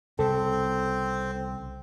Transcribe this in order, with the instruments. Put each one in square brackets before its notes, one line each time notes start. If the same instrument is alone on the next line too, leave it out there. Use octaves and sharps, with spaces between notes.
[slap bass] C2 C#3 [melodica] C4 [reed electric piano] A4